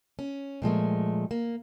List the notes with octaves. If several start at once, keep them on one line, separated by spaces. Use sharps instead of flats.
C#4
A#2 F3 G#3 A3
A#3